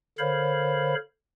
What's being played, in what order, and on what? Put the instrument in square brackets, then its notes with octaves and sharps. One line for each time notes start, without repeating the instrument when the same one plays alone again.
[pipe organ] D3 A#4 C5 C#5 F5 B5